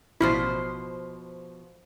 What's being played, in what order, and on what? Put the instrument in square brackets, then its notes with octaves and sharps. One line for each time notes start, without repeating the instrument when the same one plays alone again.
[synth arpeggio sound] A1 E4 B6 [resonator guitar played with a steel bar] B2 F3 C5